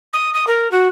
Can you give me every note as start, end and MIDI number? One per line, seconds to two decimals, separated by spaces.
0.13 0.30 87
0.33 0.44 87
0.47 0.70 70
0.71 0.88 66